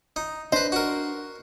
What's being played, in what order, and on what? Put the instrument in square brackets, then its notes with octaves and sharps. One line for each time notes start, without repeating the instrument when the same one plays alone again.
[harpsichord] D#4
[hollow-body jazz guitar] D4 D#5 [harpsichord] B4 C5
[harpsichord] F#4 A#4